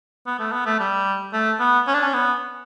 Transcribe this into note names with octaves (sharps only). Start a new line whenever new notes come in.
B3
A3
B3
A3
G3
A3
B3
C#4
D4
C#4
B3